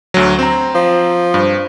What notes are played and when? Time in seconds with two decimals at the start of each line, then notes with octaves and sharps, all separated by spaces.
0.14 D2 F#3
0.39 C4 A#5
0.75 F3
1.34 G2